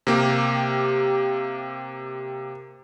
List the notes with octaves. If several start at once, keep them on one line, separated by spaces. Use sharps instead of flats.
C3 A#3 G4